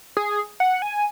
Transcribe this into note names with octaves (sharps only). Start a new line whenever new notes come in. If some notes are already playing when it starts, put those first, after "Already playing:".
G#4
F#5
G#5